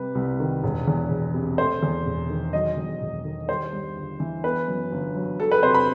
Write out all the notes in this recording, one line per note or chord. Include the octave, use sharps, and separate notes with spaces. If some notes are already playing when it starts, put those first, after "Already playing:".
Already playing: C3 G3 B4
C2
D#3
E1
E2
E1
C3
A3 C5
E2
E1
D#3
F#3 D#5
E2
E1
D#3
G3 C5
G2
G1
E3
B3 B4
F#2
G1
F#3
F#3 A4
B4
C3 C5
B5